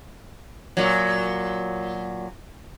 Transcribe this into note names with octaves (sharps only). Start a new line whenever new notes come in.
A#2 F#3